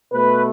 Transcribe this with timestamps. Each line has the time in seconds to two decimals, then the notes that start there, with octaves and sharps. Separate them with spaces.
0.12 B2 A3 B4